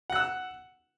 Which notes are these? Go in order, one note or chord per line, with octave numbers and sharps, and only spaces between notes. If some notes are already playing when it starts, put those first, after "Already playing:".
F#5 E6 F#6